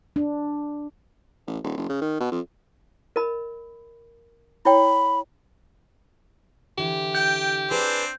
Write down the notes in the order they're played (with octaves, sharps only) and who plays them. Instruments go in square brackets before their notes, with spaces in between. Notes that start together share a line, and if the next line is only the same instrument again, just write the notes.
[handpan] D4
[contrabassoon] A1
D#1
F#1
C#3
D#3
B2
F2
[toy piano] A#4 D#5 B5
[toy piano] E4 C#5 G5 [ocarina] B5
[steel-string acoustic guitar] D3 E3 [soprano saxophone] G4
[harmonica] G5 [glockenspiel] G6
[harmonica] C4 D4 [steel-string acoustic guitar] G#4 B4